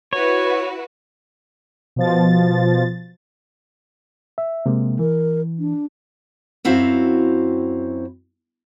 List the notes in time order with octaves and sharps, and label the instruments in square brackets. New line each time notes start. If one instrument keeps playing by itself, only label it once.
[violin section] E4 F#4 B4 [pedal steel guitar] C#5
[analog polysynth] B2 F3 A6
[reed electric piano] E5
C3 G#3 A#3
[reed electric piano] E3 [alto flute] A#4
[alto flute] D4
[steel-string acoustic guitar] F#2 C4 E4 F#4 C5 F5